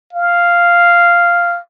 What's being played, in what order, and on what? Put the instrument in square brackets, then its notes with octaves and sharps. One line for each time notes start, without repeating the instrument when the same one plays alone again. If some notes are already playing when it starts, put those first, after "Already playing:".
[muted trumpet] F5